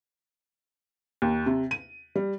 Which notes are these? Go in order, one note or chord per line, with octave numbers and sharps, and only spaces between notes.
D#2
C3
D#7
G3